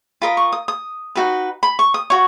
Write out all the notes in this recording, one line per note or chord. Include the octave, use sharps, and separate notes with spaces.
F4 A#4 D#5 B5
C#6
D#6
D#6
D#4 F#4 B4
B5
C#6
D#6
F#4 C#5 C#6